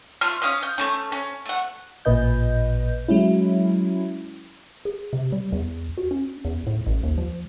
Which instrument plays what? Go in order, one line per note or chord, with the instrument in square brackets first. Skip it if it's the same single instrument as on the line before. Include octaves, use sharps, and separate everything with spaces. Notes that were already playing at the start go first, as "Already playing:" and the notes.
[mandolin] A3 F4 F6
C#4 F5 D#6 F6
G6
A3 A#3 C#4
C#4
A3 F#5
[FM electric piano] A1 A#2 B4 D#5 G6
F#3 G#3 C#4 E4
[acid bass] G#4
C3
G3
E2
F#4
C#4
E2
A2
A1
D#2
F3